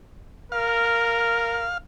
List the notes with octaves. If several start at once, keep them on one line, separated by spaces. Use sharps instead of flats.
A#4 F5